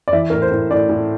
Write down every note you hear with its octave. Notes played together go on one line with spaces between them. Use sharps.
D5
E3 E5
A2 A#4
C5
A2
A2 D5
A2